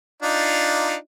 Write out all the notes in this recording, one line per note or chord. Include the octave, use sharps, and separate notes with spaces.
D4 D#4 F4